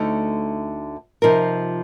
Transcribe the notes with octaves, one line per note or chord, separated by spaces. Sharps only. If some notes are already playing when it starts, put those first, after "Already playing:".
Already playing: D2 D3 A3 D#4
C3 F3 C4 D#4 A#4